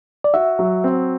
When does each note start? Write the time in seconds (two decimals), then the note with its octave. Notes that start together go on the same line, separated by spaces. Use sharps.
0.24 D5
0.34 F#4 E5
0.59 F#3
0.84 C4